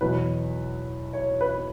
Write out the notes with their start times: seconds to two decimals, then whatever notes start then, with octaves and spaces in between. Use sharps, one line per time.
0.01 E2 B2 F#3 B4
1.13 C#5
1.41 B4